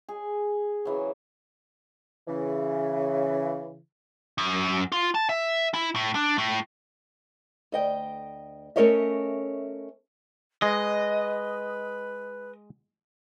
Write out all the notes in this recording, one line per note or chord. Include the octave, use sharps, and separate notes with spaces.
G#4
C#3 E3 F#3
C#3 E3
F#2
F4
A5
E5
E4
A2
D4
A2
D2 D#5 G5
A3 C#4 A#4 C#5 D#5 E5
G#3 B4 D#5